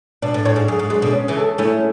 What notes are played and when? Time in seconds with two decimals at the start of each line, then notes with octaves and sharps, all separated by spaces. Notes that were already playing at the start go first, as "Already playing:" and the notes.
0.22 B2 D4
0.34 A2
0.45 A2 C#5
0.56 G#2
0.68 F#2 G#4
0.79 G#2
0.90 F#2 G#3
1.02 B2 D3
1.13 C#4
1.28 C#3 E3
1.37 A4
1.58 A3 C#4 E4